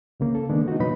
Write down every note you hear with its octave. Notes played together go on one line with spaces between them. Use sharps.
C2 C#3 A#3
A4
D#3 G#3 A#3 B3 D4
D#4 F#4
F2 B2 F#3 D#4 B4 B5